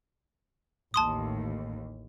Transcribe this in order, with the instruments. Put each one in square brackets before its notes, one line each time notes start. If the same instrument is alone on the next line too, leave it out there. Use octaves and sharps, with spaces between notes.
[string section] A1 D#2 [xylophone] A5 C6 D#6